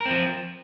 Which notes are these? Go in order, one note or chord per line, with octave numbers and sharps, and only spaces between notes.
F3 C4 A#4